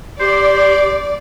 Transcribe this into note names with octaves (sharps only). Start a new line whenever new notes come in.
G4 C5 D5